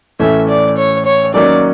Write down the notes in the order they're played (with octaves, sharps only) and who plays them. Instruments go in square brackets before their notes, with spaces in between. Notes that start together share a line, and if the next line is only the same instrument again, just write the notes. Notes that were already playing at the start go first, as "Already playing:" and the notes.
[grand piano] A2 E3 A3 C#4 [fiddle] E5
[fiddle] D5
C#5
C#5
[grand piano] D#3 F#3 A#3 C#4 [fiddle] D5